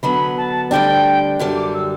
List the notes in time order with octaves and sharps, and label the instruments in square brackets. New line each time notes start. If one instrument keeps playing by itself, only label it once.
[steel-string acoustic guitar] D3 F#3 B3 [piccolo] B5
[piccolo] A5
[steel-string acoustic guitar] D2 D3 G3 D4 [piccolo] G5
[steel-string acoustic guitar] F#2 D3 G3
[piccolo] D6
E6